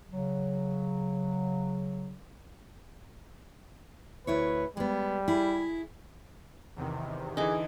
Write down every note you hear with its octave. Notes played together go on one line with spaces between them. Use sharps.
C#3 F#3
D2 E4 B4 C#5
G3 G#3 B3
E4 G#4
E2 C3 D#3
D3 E3 D#4 G#4 D6